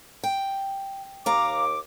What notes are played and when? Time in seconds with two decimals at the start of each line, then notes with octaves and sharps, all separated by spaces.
0.24 G5
1.26 D#2 F5 A#5 D6